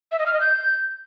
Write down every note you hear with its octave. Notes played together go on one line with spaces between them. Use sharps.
E5
D#5
F6
D#5
G6